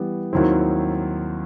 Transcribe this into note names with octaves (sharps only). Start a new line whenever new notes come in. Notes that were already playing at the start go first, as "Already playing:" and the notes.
Already playing: E3 G3 B3
D#2 D#3 F#3 C4 E4